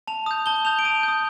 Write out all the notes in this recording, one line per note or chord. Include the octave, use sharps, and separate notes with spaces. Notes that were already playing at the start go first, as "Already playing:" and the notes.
A5 F7
D#6 G6
A5 G7
D#6 G6 F7
D7
A5 D#7
G6
D#6